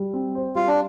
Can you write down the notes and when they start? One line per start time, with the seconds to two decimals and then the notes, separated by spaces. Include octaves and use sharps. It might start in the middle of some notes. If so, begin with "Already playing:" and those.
Already playing: G3
0.14 C4
0.35 C5
0.55 G3 F4
0.68 D4